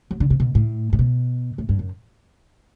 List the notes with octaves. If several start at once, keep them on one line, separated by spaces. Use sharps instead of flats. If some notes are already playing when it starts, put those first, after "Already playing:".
F#3
D3
C3
B2
A2
A2
B2
A2
G2
F#2